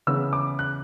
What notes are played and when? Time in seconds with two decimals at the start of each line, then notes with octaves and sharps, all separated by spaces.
0.07 C#3 E3 B3 E6
0.33 D6
0.59 F#6